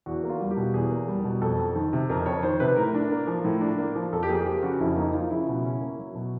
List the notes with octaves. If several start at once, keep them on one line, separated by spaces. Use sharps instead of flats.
E2 F#4
A#3
F4
G3
G4
B2
E2 G#4
A#3
G3
B2
F2 A4
F2
D#3
C3
F2 A#4
F2 C#5
D#3 C5
C3 B4
A2 A#4
D4
A#3
F3
A2
D4
A#3
F3
F2 A4
G4
A#3 G#4
F3 G4
C#3 F#4
F2 E4
A#3 D#4
F3 F4
C#3 E4
B2
C#4
A#3
F#3
B2